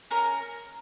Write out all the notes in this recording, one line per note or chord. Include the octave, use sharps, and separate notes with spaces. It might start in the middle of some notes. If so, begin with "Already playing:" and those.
C#4 A#4